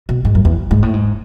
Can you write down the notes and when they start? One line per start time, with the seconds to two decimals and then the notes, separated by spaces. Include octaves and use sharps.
0.09 B2
0.25 G#2
0.35 F#2
0.45 E2
0.71 G#2
0.83 A2
0.94 G#2